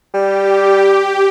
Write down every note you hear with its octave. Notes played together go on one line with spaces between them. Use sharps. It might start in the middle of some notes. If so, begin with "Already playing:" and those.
G3 G4